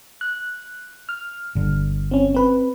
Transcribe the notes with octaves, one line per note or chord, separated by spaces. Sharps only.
F#6
F6
G1 D3
C4 C#4
C4 B4